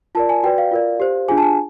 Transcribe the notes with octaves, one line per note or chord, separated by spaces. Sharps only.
F4 A#4 D5 A5
G#5
F#4 B4 D5 G5
F5
F4 A#4 D5
G4 C5
D4 F4 G#4 G#5
A5
G#5